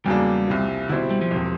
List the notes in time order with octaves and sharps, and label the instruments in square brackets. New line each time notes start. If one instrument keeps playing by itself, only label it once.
[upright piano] E2 C#3 F#3 A#3 D4 [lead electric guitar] G3
[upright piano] C2 C3 F3
[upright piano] B2 G3 C4 E4 [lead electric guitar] D3
[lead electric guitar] G3
F3
[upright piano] E1 C3